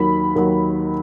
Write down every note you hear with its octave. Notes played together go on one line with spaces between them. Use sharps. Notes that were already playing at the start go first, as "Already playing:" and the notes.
Already playing: D#2 D#3 F#3 B5
D#2 D#3 F#3